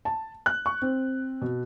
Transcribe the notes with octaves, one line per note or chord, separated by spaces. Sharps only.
A5
F#6
C#6
C4
B2